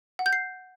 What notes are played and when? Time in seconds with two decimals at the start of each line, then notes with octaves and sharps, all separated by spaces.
0.19 F#5
0.26 G6
0.33 C7